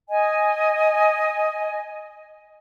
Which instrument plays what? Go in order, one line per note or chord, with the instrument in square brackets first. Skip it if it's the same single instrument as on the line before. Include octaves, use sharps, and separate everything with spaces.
[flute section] D#5 G#5